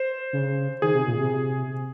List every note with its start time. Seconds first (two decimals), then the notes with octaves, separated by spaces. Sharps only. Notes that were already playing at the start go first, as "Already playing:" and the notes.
Already playing: C5
0.33 C#3
0.82 D#3 G#4
0.95 C3
1.07 A#2
1.19 C3